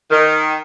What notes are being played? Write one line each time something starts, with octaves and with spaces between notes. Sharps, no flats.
D#3